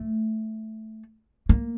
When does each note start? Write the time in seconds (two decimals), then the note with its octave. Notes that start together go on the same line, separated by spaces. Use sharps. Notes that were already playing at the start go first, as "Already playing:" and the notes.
Already playing: A3
1.49 A#3